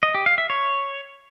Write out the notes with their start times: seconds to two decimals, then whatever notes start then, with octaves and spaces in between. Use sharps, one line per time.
0.03 D#5
0.15 G4
0.26 F5
0.38 E5
0.50 C#5